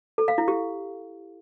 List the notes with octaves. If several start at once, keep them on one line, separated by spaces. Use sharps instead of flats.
A4
F5
E4
G4